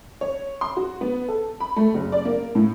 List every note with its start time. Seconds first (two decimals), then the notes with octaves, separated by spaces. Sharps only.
0.21 C#5
0.61 C6
0.77 F#4
1.01 B3
1.29 A4
1.60 B5
1.76 A3
1.94 F#1
2.12 D5
2.25 A#3
2.55 A2